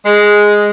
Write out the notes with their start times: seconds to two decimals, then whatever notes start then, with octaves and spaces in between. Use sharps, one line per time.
0.06 G#3